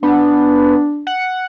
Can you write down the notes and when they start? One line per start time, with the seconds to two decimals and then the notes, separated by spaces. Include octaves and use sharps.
0.03 B3 D4
1.07 F#5